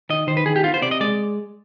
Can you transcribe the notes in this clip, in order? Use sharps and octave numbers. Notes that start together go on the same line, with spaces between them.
D#3 D#5
D#3 C5
B4
D#3 G#4
G4
B3 F4
C5
C3 D5
D#5
G#3 D5